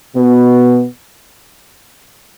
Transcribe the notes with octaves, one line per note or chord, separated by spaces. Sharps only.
B2 B3